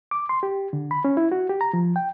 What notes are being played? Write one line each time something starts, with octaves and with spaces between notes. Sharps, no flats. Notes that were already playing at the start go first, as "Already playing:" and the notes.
D6
C6
G4
D3
B5
C#4
E4
F#4
G4
A#5
F3
G5